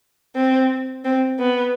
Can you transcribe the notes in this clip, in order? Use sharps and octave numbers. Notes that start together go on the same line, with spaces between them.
C4
C4
B3